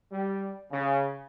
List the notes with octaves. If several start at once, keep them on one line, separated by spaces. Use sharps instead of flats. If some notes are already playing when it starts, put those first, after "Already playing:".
G3
C#3